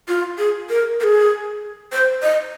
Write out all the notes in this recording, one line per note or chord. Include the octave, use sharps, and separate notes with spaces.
F4
G#4
A#4
A#4
G#4
C5
D#5